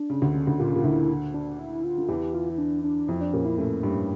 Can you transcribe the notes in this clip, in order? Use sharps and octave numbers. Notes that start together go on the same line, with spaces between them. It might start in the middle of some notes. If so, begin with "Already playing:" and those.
Already playing: D4
C#3
D2 D3
C#3
D2 D3
A#2 F4
C#3
A#2
D2 D3 E4
D4
E4
F4
D3
E2 E3 G4
F4
E4
D4
D4
F2 F3 E4
D4
A#2 A#3 C#4
E4
A2 A3 C#4
G2 G3